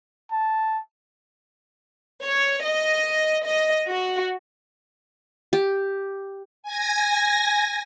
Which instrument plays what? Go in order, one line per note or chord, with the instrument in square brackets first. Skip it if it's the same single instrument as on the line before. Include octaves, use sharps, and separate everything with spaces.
[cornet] A5
[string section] C#5
D#5
D#5
F#4
[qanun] G4
[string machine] G#5 G#6 A#6